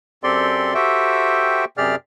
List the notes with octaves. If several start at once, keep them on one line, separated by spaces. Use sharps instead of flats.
F#2 C4 G4 A4 D5 C6
F#4 G4 A4 C5 E5 G5
F#2 C3 G4 G#4 D5 F6